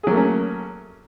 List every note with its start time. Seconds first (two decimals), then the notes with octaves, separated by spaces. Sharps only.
0.03 G#4
0.07 F#3
0.10 A#3
0.14 A3
0.17 C#4